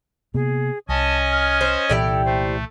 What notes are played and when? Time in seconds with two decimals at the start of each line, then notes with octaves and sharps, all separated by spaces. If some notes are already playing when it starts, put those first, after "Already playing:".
0.34 C3 A#3 B3 G#4
0.89 C2 C#4 D#5 G#5 A5
1.32 F6
1.61 C5
1.90 C2 A#2 E3 E4 G4 A4 D5
2.25 A3 C5